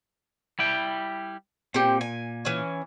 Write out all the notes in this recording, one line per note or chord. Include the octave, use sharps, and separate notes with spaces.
G3 E4 G5
A#2 C4 G4
G#5
E3 C#4